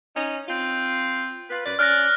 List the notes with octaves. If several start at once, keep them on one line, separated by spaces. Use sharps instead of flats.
C#4 D#4
C4 F4
F4 B4
F#2 B4 D5
C#4 D5 F6 F#6 A#6